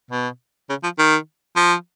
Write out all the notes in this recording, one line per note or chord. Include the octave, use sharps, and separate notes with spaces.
B2
C#3
F3
D#3
F3